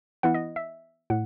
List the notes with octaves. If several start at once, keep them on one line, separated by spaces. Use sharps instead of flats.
E3 B3 E4 F#5
D#5
E5
A2 F#5